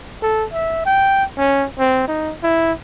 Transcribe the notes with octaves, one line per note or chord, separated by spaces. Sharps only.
A4
E5
G5
C#4
C4
D#4
E4